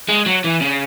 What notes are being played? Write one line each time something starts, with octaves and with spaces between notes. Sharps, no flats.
G#3
F#3
E3
C#3